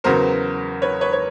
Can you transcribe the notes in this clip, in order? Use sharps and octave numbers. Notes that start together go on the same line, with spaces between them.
E2 C#3 F#3 B3 A#4 C5
B4 C#5
B4 C#5
C#5